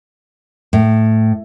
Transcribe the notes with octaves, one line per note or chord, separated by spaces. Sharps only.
A2